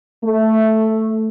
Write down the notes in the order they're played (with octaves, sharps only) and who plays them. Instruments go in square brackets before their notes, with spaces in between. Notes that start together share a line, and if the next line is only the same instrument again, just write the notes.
[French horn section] A3